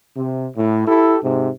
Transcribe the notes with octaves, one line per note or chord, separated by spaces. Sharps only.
C3
A2
E4 G4 A4
G#2 C3